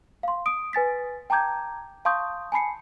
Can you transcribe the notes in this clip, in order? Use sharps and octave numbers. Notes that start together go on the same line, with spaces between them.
F5 C6
D#6 D7
B4 G#5 A6 B6
G5 A5 A#5 D6 G6 G#6
F5 A5 C6 C#6 D#6 G6
G#5 A5 B5 C7 C#7